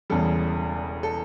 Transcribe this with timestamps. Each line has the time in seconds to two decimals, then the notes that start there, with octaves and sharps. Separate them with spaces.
0.10 E1 E2 C#3 G3 A4
1.03 A4